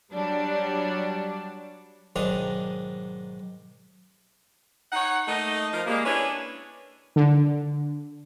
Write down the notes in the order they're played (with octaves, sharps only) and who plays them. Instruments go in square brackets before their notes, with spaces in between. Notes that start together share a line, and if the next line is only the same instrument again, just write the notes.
[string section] F#3 G3 D4
[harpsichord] B1 G#2 D#3 D4 D#5 A#5
[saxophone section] D#4 C#5 F#5
A3 A#3 D#4 D#5
F3 A#4
G3 G#3 A#3
C#4 D4 E4 B4 C#5
[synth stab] D3